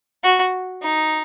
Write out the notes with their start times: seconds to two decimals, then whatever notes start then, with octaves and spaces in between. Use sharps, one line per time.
0.23 F#4
0.82 D#4